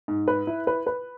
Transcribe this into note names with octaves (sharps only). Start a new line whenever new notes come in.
G#2
B4
E4
B4
B4